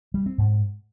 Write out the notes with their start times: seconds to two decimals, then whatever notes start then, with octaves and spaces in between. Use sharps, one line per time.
0.14 G3
0.26 C4
0.38 G#2